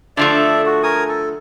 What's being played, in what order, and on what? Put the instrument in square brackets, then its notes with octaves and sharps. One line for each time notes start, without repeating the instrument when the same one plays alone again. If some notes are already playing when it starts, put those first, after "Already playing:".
[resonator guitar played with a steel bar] D3 F3 A3 [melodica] D5 E5
[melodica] F#4
A#4 G#5 D#6
A4